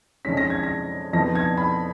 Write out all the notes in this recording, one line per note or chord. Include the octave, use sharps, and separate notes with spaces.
F2 D#3 G#3 C#4 B6
A#6
G#6
A#6
F2 F3 B3 D#4 A#6
G#6
B5